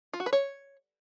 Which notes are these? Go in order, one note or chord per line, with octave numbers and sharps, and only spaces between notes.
F4
F#4
B4
C#5